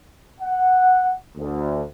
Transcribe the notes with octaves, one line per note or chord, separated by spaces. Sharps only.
F#5
D2